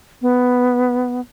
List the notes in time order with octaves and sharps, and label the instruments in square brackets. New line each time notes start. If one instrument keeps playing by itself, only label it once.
[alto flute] B3